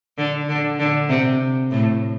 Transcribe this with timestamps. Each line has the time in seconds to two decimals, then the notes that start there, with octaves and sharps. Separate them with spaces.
0.18 D3
0.48 D3
0.79 D3
1.09 C3
1.71 A2